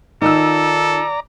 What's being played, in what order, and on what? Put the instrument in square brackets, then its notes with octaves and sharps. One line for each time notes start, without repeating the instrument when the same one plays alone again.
[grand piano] D#3 E6 [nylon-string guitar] D#4 F4 [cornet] A4 [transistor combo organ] D5 A#5